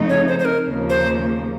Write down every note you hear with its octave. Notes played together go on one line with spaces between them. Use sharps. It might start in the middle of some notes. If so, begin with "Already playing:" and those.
Already playing: F2 C#3 A3 D#4
C#5
C5
C5
A#4
D#2 C#3 F3 A#3
C5